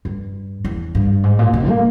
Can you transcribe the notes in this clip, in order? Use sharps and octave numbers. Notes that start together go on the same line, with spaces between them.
G2
E2
G2
G#2
A#2
B2
A#3